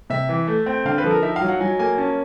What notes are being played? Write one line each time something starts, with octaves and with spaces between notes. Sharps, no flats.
C3 E5
E3
A3
C4
D3 F5
B4
F3 A4
A#4
D#4 E5
F5
F#3
F#5
F#3 G#5
A#3 G#5
C#4 A5